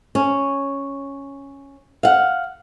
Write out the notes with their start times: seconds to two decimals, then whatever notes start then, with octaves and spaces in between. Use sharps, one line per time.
0.15 C#4
2.03 F5 F#5